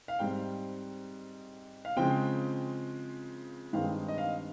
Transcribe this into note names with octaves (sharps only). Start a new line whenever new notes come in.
F5
G#2 G3 C4 G5
F5
C#3 F3 G#3 C4 G5
G2 D#3 G#3 C4 F5
D#5
F5